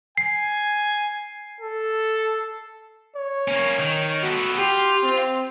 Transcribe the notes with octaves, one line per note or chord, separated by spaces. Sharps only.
G#5 C7
A4
C#5
A#3 C#4
D#3
B3 F#4 A4
F4 G4
C4